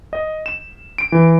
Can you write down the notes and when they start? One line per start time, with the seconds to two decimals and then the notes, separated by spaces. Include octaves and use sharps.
0.13 D#5
0.46 E7
0.98 D7
1.12 E3